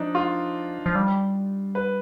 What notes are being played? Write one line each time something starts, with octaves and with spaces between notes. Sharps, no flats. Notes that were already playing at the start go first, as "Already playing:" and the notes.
Already playing: F3 D4 D#4
F4
F3
G3
B4